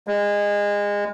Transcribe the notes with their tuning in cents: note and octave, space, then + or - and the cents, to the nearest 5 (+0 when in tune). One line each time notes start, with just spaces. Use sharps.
G#3 -25